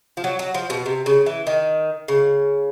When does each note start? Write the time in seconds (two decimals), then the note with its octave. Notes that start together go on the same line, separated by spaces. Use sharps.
0.17 F3
0.24 F#3
0.39 F#3
0.54 F3
0.70 B2
0.86 C3
1.06 C#3
1.26 E3
1.47 D#3
2.08 C#3